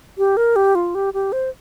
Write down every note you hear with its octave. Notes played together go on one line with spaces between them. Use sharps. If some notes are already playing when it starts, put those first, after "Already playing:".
G4
A#4
G4
F4
G4
G4
C5